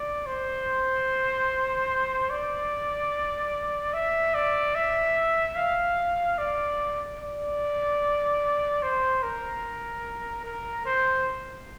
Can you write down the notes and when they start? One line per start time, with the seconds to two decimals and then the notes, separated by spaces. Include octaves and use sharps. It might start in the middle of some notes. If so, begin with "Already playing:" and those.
Already playing: D5
0.26 C5
2.30 D5
3.93 E5
4.34 D5
4.75 E5
5.56 F5
6.38 D5
7.20 D5
8.83 C5
9.23 A#4
10.45 A#4
10.85 C5